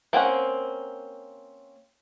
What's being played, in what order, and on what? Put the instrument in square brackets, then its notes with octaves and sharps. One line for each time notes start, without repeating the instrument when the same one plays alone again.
[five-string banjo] A#3 C4 C#4 F#5